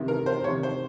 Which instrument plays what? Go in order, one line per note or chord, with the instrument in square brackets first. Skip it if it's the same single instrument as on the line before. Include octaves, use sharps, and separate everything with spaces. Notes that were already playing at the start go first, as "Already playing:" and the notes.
Already playing: [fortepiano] C3 D#3
A#4
C5
C3 D#3 C#5
C5